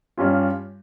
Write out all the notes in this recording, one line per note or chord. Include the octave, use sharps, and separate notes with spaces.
G2 G3 C#4 F4